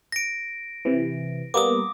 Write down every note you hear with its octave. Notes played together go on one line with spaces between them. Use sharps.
A#6 D7
C3 E3
G3 A#3 B3 D6 D#6